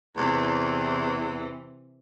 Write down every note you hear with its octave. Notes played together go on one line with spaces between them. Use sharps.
E2 C3 E3